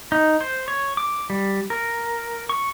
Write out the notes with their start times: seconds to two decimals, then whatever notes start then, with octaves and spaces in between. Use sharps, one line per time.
0.12 D#4
0.41 C5
0.68 C#5
0.97 D6
1.30 G3
1.70 A#4
2.49 C#6